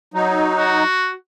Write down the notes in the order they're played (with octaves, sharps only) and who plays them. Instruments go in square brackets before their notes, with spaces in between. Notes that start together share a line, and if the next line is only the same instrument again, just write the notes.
[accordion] F#3 D#4
[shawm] F#4